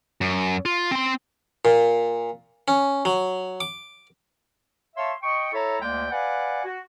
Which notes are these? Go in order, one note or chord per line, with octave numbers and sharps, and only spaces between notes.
F#2
F4
C4 C6
A#2
C#4
F#3
D6
C#5 E5 F5 A5 C6
D#5 G5 C#6
E4 A4 C#5 E5 A#5
D2 G#3 A#3 D5 G5
B4 D5 F5 F#5 G#5
F#4